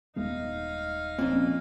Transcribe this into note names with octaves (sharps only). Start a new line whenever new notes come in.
D#1 G#3 B3 D#4 F5
F2 A#2 C4 C#4